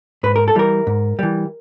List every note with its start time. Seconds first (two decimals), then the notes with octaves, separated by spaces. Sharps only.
0.23 G#2 B4
0.36 A#4
0.48 A4
0.55 E3 G3 A#4
0.87 G#2
1.19 E3 G3